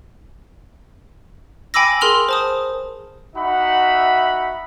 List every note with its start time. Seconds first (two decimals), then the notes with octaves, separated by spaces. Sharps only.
1.74 G5 G#5 B5 D6 E6 A#6
2.01 G#4 A#4 C6 F6 F7 F#7
2.29 C5 A5 D#6
3.36 D#4 F#4 E5 F#5 B5